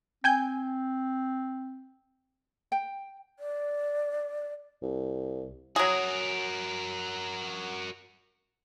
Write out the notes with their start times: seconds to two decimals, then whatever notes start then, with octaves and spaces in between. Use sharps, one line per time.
0.24 C4 G5 G#5 G6
2.72 G5
3.39 D5
4.82 C2
5.76 F#3 F#4 G#4 A#4